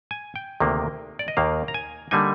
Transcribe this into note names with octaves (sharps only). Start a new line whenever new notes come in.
G#5
G5
D2 C3 D#3 A#3
D5
D#5
D#2 D#3 A#3 F5
A#5
G#5
D3 G3 A#3 D#4 G#5